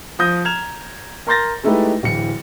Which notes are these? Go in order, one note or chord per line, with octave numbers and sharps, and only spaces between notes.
F3 D#6 G6 A#6
A#5 F6 G#6 E7 F7
A#4 A#5 C6 G6 A6 A#6
G#3 A3 D#4 E4 G4 B4
D1 E3 C#7